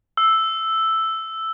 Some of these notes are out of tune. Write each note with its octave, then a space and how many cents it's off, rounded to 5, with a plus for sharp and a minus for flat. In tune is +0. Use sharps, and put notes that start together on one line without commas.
E6 +0